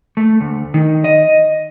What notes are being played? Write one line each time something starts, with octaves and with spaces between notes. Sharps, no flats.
A3
D2
D#3
D#5